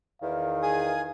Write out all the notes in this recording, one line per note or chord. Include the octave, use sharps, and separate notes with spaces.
E2 D#3 F5
G#4 G#5 D#6